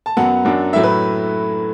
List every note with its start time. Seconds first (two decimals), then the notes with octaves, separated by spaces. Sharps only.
0.06 A5
0.17 F#2 F#3 B3 F#5
0.45 F#2 F#3 D4
0.73 A2 F#3 A3 E4 E5
0.83 B4